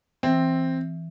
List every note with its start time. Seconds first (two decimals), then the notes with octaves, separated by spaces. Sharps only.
0.23 E3 C4